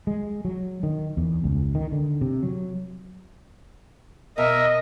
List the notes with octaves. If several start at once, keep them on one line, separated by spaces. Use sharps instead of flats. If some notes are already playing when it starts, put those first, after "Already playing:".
G#3
F#3
D#3
E2
C#2
D#3
D3
C3
F#3
B2 A#4 D#5 E5